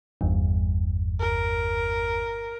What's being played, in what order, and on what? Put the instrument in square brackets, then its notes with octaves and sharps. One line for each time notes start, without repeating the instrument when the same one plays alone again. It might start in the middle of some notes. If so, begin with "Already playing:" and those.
[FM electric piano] G1 E2 G2
[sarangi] A#4